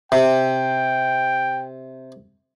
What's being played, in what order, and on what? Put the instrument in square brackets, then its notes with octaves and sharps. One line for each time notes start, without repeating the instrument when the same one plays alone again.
[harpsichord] C3 [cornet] G5